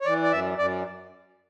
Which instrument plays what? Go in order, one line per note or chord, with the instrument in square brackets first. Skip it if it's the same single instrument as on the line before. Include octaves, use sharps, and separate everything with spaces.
[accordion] C#5
E3 D5
D5
F#2 E5
F#2 D5